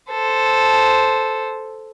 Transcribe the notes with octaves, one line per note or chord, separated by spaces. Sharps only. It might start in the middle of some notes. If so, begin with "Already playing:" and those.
A4 C5